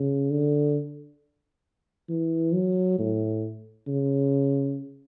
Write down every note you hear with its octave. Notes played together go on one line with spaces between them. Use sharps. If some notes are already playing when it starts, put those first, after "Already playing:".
Already playing: C#3
D3
E3
F#3
A2
C#3